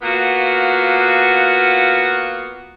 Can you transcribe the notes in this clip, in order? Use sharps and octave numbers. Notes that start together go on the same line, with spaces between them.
A#3 B3 F4 F#4